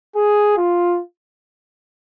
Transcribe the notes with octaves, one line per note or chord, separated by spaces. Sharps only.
G#4
F4